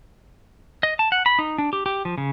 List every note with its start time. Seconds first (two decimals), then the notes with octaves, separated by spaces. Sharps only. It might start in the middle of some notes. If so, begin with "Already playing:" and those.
0.83 D#5
0.99 A5
1.12 F#5
1.26 B5
1.39 D#4
1.58 D4
1.73 G4
1.86 G4
2.05 F3
2.18 C#3